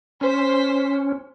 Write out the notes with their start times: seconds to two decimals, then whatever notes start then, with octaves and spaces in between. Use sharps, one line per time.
0.21 C#4 C5 B6